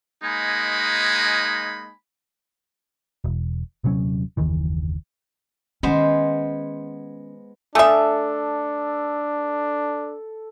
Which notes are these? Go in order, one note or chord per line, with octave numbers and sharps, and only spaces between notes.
G#3 A#3 D#4 G#5 B5
E1
D#1 C3 F#3 C#4
F#1 D#2 D#3 E3
D#3 G#3 B3 C#4 C5
A3 D4 A4 E5 G#5 D#6